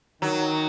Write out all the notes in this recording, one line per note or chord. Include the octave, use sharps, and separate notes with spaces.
D#3 F#3